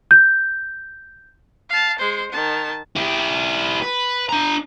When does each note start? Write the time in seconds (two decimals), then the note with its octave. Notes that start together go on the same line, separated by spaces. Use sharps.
0.11 G6
1.69 F5 A5
1.98 G#3 C5
2.31 D#3 A5
2.96 E4 G4
3.82 B4
4.29 D4 A#5